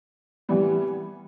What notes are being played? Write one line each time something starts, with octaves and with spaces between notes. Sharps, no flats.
C3 E3 G3 B3